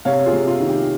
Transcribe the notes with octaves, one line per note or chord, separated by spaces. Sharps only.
C3 C#5 F5
F4 G#4
C3
F4
D#3
G4